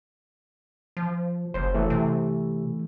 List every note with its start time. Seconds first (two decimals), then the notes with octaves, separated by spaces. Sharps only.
0.97 F3
1.54 F#1 C5
1.74 E3 A3
1.90 C3